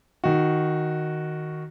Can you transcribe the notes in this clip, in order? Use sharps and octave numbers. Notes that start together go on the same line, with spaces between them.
D#3 F#4